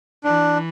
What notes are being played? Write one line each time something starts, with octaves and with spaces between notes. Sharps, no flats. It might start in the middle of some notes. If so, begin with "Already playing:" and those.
E3 D4